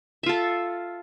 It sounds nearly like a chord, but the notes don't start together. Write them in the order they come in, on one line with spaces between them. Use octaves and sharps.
E5 F4 A4